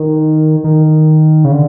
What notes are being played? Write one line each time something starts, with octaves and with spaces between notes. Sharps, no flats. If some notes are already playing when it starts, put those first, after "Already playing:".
Already playing: D#3
D#3
C#3
D3